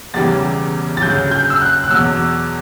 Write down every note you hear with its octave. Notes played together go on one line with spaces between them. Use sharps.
E1 E2 C#3 E3 G3 A6
A6
D2 C#3 F#3 G6
G6
E6
F#6
F#6
E2 B2 F#3 E6